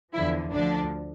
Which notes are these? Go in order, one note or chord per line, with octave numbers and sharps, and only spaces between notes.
E2 D3 F3 E4
D2 D3 F3 D4